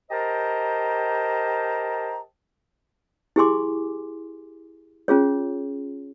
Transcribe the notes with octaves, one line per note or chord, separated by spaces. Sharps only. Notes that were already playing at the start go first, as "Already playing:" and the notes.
G4 A#4 C5 D#5 A5 A#5
E4 G4 G#4 G#5 C6 D6
C#4 F4 G#4 C#5